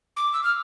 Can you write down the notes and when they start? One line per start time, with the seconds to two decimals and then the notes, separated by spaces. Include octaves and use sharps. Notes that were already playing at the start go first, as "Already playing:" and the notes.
0.17 D6
0.34 E6
0.43 F6